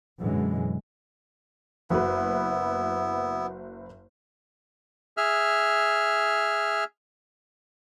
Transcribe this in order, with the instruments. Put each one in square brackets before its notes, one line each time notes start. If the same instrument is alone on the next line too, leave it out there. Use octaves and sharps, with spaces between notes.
[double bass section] F#2 B2 D3 E3 G#3
[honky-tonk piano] F#1 F#4 B4 [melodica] B3 E4
[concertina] G#4 E5 F6